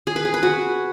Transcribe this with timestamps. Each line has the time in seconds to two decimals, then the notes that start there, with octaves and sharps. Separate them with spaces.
0.07 G#4
0.16 B4
0.25 G#4
0.34 B4
0.43 F#4